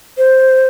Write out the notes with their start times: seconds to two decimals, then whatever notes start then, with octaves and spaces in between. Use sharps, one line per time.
0.18 C5